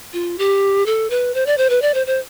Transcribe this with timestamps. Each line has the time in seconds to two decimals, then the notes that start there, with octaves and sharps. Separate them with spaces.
0.13 F4
0.38 G4
0.86 A4
1.10 B4
1.34 C5
1.46 D5
1.58 C5
1.70 B4
1.82 D5
1.94 C5
2.07 C5